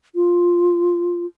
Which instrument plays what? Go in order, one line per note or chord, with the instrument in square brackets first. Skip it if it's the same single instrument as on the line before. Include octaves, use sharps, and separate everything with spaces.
[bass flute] F4